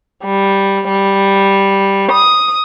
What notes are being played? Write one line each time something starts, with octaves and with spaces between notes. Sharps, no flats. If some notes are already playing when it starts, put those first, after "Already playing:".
G3
G3
D#6